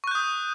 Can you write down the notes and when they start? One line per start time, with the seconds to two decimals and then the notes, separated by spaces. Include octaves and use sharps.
0.04 C#6
0.07 F#6
0.11 G6
0.15 D#6